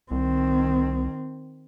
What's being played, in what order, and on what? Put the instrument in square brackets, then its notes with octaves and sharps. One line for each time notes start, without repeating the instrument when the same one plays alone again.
[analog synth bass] C2 [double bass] D#3 C4